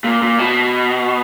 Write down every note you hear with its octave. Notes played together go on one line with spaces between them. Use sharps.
A#2
A#2
B2